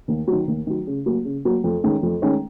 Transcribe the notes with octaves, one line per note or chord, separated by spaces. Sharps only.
D#2
D#3 F#3
D#2
D#3 F#3
C#3
F#3 A#3
C#3
F#3 A#3
F2
D#3 G#3 C#4
F2
D#3 G#3 C#4